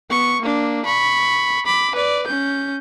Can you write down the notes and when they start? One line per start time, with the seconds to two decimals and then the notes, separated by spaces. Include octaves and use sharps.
0.10 B3 C#6
0.41 A#3 D4
0.85 B5 C#6
1.66 B5 D6
1.95 B4 D5
2.27 C#4 G6